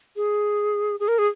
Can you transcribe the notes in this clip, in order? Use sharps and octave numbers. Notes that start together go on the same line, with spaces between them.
G#4
G#4
A#4
G#4